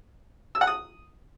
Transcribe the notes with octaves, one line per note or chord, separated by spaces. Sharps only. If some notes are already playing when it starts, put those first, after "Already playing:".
E6
F#5
D#6